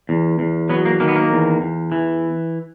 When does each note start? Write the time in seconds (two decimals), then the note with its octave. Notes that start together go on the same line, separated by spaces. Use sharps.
0.09 E2
0.39 E2
0.70 F#3 B3
0.85 A#3
1.00 D#3 A#3
1.08 B3
1.16 A#3
1.31 E2
1.61 E2
1.92 E3